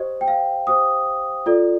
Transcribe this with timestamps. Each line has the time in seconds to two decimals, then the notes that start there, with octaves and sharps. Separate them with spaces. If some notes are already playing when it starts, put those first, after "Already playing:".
Already playing: G4 C5 D#5
0.21 G5
0.28 F5
0.67 G4 C5 D#6
1.46 F4 A4 D5